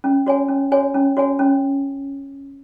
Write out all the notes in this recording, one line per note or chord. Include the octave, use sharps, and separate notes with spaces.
C#4
F#4 C#5 G#5
C#4
F#4 C#5 G#5
C#4
F#4 C#5 G#5
C#4